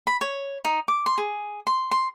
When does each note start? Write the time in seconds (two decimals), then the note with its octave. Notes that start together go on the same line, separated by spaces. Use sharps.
0.07 B5
0.21 C#5
0.65 D#4
0.88 D6
1.06 C6
1.18 G#4
1.67 C6
1.91 C6